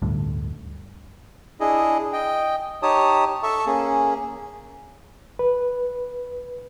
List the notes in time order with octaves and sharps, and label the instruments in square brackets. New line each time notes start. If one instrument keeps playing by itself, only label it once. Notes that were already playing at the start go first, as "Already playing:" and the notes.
[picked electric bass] D1 D2 G2 D3
[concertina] D4 E4 G#4 D#5
D#5 G5
D#4 G4 C#5 A5 D#6
A4 E5 A5 C#6
A#3 C#4 G#4
[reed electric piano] B4